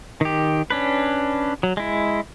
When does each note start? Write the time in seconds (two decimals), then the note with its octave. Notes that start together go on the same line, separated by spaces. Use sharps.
0.21 D#3 G4
0.71 C#4 D4 B4
1.63 F#3
1.77 G#3 E4